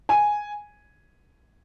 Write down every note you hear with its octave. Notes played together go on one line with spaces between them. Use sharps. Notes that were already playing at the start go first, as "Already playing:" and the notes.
G#5